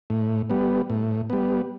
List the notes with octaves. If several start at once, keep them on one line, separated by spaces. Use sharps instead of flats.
A2
G3 B3
A2
G3 B3